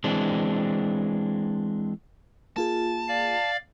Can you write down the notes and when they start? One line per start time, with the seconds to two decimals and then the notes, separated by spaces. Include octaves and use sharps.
0.04 E3 G#3 C4 D4
2.56 A#3 F4 G#4 A5
3.09 D5 F5